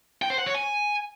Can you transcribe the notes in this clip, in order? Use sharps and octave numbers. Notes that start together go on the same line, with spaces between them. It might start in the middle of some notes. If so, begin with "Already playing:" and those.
G5
C5
F#5
C#5
G#5